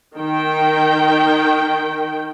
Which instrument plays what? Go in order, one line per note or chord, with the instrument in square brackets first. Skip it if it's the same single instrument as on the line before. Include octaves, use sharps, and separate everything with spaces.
[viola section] D#3 G5